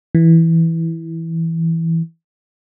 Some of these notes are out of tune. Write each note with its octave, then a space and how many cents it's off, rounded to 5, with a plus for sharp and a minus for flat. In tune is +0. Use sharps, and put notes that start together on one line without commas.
E3 -5